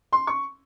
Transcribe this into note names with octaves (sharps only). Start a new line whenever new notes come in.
C6
C#6